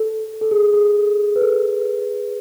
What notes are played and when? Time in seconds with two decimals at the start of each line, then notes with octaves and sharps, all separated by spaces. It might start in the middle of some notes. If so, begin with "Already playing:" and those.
Already playing: A4
0.41 A4
0.51 G#4
0.73 G#4
1.36 B4
1.42 A4